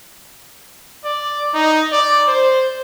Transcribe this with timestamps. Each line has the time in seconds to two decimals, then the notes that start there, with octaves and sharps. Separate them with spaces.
1.05 D5
1.54 D#4
1.92 D5
2.28 C5